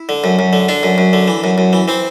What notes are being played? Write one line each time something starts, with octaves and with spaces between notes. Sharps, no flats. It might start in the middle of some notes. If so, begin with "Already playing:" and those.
Already playing: E4
D3
F#2
F#2
D3
D3 D4
F#2
F#2
D3
E3
F#2
F#2
E3
E3 C4